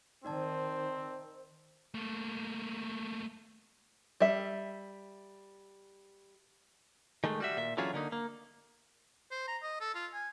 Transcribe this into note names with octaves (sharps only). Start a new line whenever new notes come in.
D#3 C4 D#4 C5 D5 A5
A3 A#3
G3 E5
D#3 G#3 A3
G3 F#4 E5
A#2 E5
D3 E3 F#3 C#4 F4 G#4
D3 A#3 D#4
A#3
C5
A#5
D#5
A4
F4
G#5